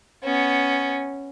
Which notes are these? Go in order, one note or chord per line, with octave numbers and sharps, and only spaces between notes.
B3 C#4